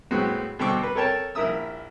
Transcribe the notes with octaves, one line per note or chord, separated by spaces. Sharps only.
A2 G#3 B3 C4 F#4
B2 D3 C4 G5 C#6 D6
B4
A4 A#4 C#5 G5 A5
A#1 E4 A#4 E5 D#6 E6